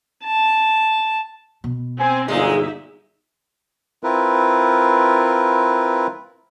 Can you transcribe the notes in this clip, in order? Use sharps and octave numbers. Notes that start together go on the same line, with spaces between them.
A5
B2
C4 G#5
G1 A#2 F#3 G#3 A#3 D#4 E5
C4 E4 F4 A#4 B4